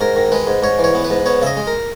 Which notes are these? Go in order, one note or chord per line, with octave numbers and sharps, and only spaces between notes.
G#2 A#4
D#3
G#3 B4
G#2
G#2 C#5
E3
C#5
B3
B4
G#2
B3 C#5
C#3 D#5 E5
G#3
A#4